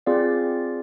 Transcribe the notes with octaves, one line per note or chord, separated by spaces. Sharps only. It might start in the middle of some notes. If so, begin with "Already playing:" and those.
C4 F4 G#4 D5 F5